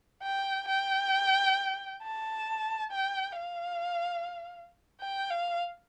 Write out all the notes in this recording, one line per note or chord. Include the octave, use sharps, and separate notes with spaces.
G5
G5
A5
G5
F5
G5
F5